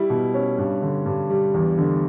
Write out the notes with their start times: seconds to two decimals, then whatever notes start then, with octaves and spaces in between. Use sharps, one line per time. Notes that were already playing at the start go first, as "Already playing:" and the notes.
Already playing: G3 E4
0.10 B2
0.34 C#4
0.58 G2
0.82 D3
1.06 G2
1.30 G3
1.54 E2
1.78 D3